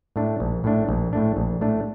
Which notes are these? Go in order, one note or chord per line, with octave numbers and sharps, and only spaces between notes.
A2 A3 D4
A#1
A2 A3 D4
A#1
A2 A3 D4
A#1
A2 A3 D4